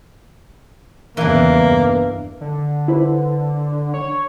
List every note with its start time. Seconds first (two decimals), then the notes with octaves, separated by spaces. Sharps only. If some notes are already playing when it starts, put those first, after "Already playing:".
1.17 E2 G2 C#3 E3 A#3 D4
2.41 D3
2.88 E4 B4 C5
3.94 C#5